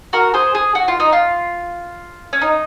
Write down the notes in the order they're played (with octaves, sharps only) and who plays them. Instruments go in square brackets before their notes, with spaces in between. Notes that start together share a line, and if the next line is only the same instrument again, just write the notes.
[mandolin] F#4 A#4
G#4 C5
G#4
F#4
F4
D#4
F4
C#4
D#4